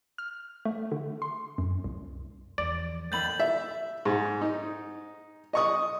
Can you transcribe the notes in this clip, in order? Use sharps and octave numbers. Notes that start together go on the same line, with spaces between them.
F6
A3
D3
C6
F#2
C2
E2 F3 D5
A1 D#2 B5 G6 A6 F#7
E5
G#2
D#4
D#5 C#6 D#6